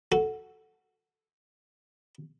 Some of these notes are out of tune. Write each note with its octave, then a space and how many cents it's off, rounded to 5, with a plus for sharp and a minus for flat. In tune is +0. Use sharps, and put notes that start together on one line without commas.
F#4 +0 A4 -5